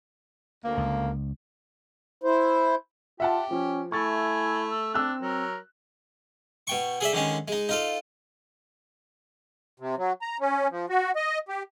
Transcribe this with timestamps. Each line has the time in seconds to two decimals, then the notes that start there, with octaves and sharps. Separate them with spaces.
0.65 D2 A#3
0.77 C#2
2.23 E4 C5
3.20 F4 G4 E5 F#5 A5
3.51 F3 C#4
3.92 A3 E4 G#5 C#6 A6
4.71 E6
4.94 C4 D4 E6 F#6
5.22 F#3 A#4
6.67 B2 G5 C#6
7.01 G#4 A4 D5 E5
7.13 D3 D#3 G#3 C#4
7.48 G#3 D#4
7.69 D#4 F4 A4
9.80 C3
9.98 F#3
10.22 A#5
10.40 C#4
10.71 F3
10.89 F#4
11.16 D#5
11.49 G4